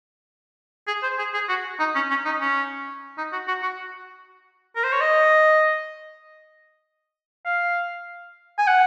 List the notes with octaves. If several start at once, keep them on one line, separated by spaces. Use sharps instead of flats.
G#4
C5
G#4
G#4
F#4
D#4
C#4
C#4
D#4
C#4
D#4
F#4
F#4
F#4
A#4
C5
C#5
D#5
F5
G#5
F#5